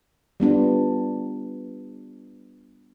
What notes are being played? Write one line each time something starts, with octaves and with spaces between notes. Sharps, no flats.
G3 B3 D4 F4